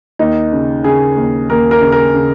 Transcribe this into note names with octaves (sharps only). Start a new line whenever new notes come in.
D#2 D#4
C#3
C#3 G#4
D#2
D#2 A#4
A#4
C#3
A#4
C#3